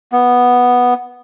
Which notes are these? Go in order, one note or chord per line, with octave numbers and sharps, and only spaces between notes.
B3